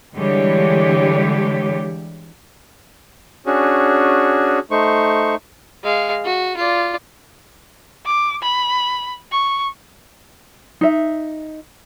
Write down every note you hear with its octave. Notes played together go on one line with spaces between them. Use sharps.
D3 E3 G3 G#3 G4 C#5
C#4 D4 F#4 G#4
A3 D#4 C5 C#6
G#3 F5
F#4
F4 D5
D6
B5
C#6
D#4 E5